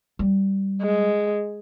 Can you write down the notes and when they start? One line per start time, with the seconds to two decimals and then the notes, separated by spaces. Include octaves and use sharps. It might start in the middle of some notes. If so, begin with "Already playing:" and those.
0.19 G3
0.82 G#3